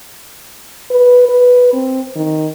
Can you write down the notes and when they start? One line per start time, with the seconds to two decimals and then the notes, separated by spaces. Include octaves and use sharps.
0.90 B4
1.29 B4
1.73 C4
2.15 D#3